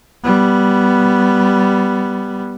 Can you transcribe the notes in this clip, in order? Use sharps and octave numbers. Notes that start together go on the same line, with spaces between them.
G3 B3